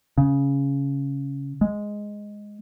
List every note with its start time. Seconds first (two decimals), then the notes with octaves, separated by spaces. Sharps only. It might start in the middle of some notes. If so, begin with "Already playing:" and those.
0.18 C#3
1.61 G#3